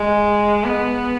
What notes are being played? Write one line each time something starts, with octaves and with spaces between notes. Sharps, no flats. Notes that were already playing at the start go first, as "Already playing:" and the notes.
Already playing: G#3
B3